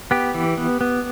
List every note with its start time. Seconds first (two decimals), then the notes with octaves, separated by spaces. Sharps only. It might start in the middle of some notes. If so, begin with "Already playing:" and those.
0.11 B3 G4
0.34 E3
0.57 B3
0.81 B3